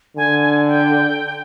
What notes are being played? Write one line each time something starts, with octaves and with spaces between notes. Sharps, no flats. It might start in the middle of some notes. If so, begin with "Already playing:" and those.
D3 G#5
G#5
G5